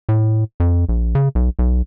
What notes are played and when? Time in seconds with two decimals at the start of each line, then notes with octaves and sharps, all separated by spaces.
0.09 A2
0.60 F2
0.89 A#1
1.15 C#3
1.35 B1
1.59 B1